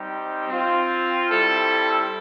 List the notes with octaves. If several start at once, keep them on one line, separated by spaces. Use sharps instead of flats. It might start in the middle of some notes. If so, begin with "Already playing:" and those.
Already playing: G3 C4 D#4 G4
C4 F4
G3 C4 E4 A4